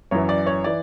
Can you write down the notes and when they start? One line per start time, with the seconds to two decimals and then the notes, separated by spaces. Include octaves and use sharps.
0.11 F#2 E3 C#5
0.29 D5
0.47 C#5
0.64 E3 D5